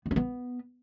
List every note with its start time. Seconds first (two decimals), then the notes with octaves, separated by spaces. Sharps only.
0.06 B3
0.11 C#4
0.16 B3